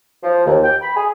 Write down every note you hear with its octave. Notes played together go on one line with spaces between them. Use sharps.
F3
D#2
G5
B5
G#4